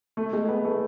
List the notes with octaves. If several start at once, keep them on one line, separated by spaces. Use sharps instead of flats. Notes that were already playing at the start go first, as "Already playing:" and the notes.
A3
G#3
B3
A3